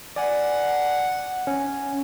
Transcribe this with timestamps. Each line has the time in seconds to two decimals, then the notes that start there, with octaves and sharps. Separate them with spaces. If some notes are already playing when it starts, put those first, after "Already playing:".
0.16 D5 F#5 G#5
1.47 C#4